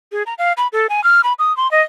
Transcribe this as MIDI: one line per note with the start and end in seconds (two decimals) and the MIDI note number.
0.12 0.23 68
0.26 0.34 82
0.38 0.53 77
0.57 0.67 83
0.73 0.87 69
0.90 1.03 80
1.04 1.21 89
1.24 1.33 83
1.39 1.55 87
1.57 1.70 84
1.71 1.82 75